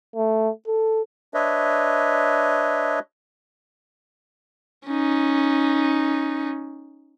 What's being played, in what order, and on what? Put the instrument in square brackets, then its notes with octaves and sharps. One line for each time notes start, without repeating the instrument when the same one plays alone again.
[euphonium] A3
A4
[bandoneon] D4 B4 C#5 D#5 E5
[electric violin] C#4 D#4